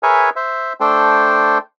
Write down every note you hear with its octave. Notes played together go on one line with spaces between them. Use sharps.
G#4 A#4 B4 C#5 E5 G#5
C5 E5
A3 D4 A4 C5 G5